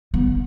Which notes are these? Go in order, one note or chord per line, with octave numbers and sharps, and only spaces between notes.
B3